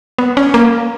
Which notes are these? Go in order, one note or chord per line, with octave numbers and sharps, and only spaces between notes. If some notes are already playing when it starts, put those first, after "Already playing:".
B3
C#4
A#3